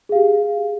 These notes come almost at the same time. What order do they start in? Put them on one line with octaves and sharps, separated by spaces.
G#4 F5 G4